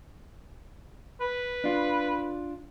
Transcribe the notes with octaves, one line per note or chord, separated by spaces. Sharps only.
B4
D4 F4